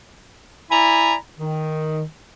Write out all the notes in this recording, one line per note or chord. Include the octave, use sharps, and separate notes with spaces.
E4 D5 G#5 A#5 B5
D#3